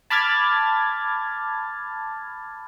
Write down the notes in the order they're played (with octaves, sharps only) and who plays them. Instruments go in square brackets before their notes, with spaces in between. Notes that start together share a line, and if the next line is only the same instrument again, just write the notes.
[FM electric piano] A5 B5 D6 F6 G#6 A6